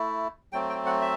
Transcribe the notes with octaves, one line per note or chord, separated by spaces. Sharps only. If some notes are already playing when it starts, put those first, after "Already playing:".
Already playing: A3 E4
F#3 A3 C4 G5
G5
F#5
E5